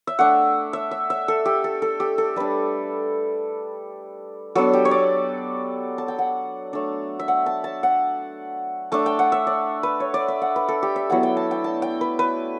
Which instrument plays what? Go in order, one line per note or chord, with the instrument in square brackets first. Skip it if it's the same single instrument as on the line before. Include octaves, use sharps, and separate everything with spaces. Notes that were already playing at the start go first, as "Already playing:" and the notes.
[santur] E5
A3 D4 F#5
E5
E5
E5
A4
G4
A4
A4
G4
A4
G3 D4 B4
F#3 B3 D4 A4
G4
C#5
D5
A5
G5
F#5
A3 D4
E5
F#5
A5
A5
F#5
A3 D4 A5
G5
F#5
E5
D5
B4
C#5
D5
E5
F#5
B4
A4
G4
E5
F#3 B3 E4 F#5
G5
A5
G5
A5
G5
B4
B4